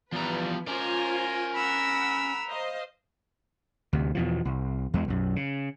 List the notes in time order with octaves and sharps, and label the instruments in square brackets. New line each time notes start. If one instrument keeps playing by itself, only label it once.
[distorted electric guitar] E2 G3 [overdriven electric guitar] F3 A#5 [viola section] B4
[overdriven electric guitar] C#4 D5 [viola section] F4 C5 G#5 [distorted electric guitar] A#4
[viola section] F#5 [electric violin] B5 E6
[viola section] C5 D#5 F5
[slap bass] D2 C3
E2 B2 F3
C2
E2 G#3
B1 F#2
C#3